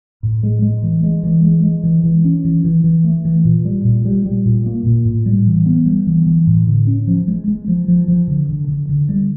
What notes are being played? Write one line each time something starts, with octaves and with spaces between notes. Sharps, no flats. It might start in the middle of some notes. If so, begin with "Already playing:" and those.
A2
G#3
G#3
E3
G#3
E3
G#3
G#3
E3
E3
C#4
E3
E3
E3
A3
E3
A#2
G3
A#2
G3
G3
A#2
A#3
A#2
A2
G3
E3
B3
G3
E3
E3
A2
D3
C#4
F3
G#3
G#3
F3
F3
F3
D3
D3
D3
D3
G3